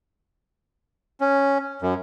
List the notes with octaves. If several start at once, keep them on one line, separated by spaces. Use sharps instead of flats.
C#4
F#2